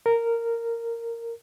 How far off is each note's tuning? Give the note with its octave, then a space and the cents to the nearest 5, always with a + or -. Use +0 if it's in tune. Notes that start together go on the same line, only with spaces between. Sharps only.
A#4 -10